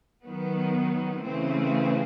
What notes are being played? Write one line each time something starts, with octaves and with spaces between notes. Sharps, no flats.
D#3 F#3 B3
C#3 E3 A3 C4